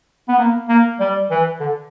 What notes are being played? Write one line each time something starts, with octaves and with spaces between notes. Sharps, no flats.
B3
A#3
A#3
G3
E3
D3